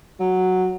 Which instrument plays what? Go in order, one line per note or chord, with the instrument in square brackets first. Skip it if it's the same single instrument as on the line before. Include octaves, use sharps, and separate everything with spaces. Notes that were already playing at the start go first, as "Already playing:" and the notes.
[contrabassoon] F#3